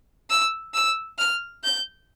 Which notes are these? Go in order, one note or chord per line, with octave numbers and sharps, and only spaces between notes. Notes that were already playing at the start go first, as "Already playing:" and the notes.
E6
E6
F6
G6